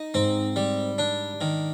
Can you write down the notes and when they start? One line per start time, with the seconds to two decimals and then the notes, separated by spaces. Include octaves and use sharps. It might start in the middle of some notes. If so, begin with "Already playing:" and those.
Already playing: D#4
0.14 G#2 C4
0.56 G3
0.98 D4
1.41 D#3